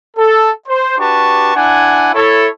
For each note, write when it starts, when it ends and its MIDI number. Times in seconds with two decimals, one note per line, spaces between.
0.17 0.50 69
0.68 0.98 72
0.99 1.52 62
0.99 1.52 66
0.99 1.52 67
0.99 1.52 71
0.99 1.52 81
0.99 1.52 85
1.55 2.11 62
1.55 2.11 64
1.55 2.11 78
1.55 2.11 80
2.14 2.48 64
2.14 2.48 69
2.14 2.48 73